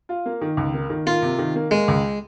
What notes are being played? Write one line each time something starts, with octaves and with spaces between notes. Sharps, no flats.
F4
A#3
D#3
C#2
A#3
D#3
A#3 F4
C3
D#3
A#3
G#3 A#3
C#2